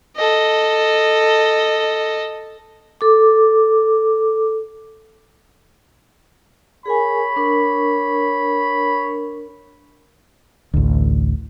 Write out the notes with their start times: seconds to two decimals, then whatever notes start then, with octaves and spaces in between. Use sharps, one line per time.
0.17 A4 D#5
3.01 A4 D6
6.86 G#4 A#4 C#5 G#5 B5
7.36 D4 A#4 C#6
10.74 A1 D2